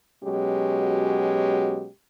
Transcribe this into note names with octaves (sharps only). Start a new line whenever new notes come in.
B2 F#3 G#3 C#4 G4